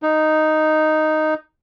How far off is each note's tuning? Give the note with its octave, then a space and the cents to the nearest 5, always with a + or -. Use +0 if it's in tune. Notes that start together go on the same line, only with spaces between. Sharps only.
D#4 +0